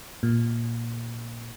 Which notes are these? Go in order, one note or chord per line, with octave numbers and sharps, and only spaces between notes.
A#2